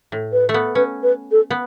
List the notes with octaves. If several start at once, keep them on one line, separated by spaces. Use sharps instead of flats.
A2
B4
A3
B3
C#4 B4
B4
A4
B3